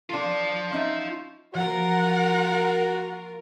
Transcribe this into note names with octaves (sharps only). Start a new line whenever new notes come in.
D4 F4 A4 A5
C#4 D#4 E5
F3 A#3 F4 F#4 A#4 F#5